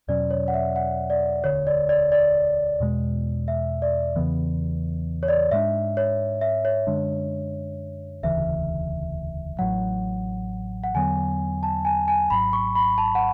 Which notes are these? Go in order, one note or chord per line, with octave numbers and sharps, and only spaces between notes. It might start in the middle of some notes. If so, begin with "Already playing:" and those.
E2 B2 F#3 C#4 D5
C#5
F#5
E5
F#5
D5
E1 D2 D3 C#5
D5
D5
D5
E2 B2 G#3
E5
D5
E2 C#3 E3 B3
C#5
D5
G#2 G#3 D4 E5
C#5
E5
C#5
F#2 D3 G#3 D4
E1 D2 C#3 E3 E5
A1 A2 F#3 F#5
F#5
E2 D3 F#3 B3 G#5
A5
G#5
G#5
G#1 G#2 F#3 B5
C#6
B5
A5
F#5